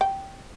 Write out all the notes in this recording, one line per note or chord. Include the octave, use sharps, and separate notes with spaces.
G5